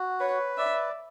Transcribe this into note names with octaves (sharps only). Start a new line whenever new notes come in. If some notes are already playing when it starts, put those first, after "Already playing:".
Already playing: F#4
B4 C#5
D5 E5